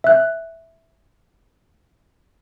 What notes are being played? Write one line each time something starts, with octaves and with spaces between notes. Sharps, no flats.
E5 F#6